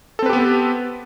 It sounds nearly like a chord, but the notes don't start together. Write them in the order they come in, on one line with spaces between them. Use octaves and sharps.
A4 C4 B4 G4 B3